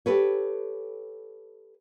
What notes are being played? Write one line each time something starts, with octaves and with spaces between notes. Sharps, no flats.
G4 A4 B4 C#5